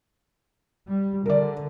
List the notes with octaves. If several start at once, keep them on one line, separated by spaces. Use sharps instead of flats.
G3
D3 A#4 D5